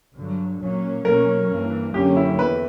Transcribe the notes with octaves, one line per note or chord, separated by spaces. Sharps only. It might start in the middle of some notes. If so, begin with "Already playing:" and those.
G2 D3 F#3
A#2 F#3 A#3 C#4
B2 F#3 A#3 C#4 A#4
G2 E3 A#3
F#2 D3 A#3 C#4 G4
E4
E2 B4